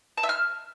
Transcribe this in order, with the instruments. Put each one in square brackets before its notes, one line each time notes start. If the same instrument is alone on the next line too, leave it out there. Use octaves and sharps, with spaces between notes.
[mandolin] A5
E5
F6